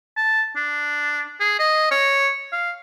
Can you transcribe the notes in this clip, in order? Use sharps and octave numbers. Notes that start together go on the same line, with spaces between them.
A5
D4
G#4
D#5
C#5
F5